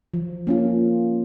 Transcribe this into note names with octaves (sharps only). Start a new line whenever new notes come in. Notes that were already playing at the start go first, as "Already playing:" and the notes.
F3
A#3 C#4 F4